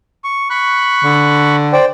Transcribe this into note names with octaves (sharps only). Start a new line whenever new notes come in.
C#6
B5 C#6 F#6
D3
C5 D5 G5